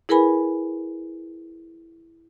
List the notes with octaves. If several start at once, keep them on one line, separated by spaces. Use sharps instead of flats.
E4 G#4 A#4 B4 G#5 B5